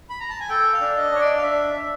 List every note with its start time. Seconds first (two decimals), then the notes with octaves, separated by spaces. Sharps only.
0.10 B5
0.20 A#5
0.30 A5
0.40 G#5
0.49 A4 G5
0.73 F5
0.81 D4
0.96 D#5
1.11 D4 C#5
1.20 D5
1.37 F5
1.42 D4 E5
1.73 D4